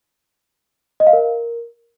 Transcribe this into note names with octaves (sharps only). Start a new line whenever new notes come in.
D#5
F5
A#4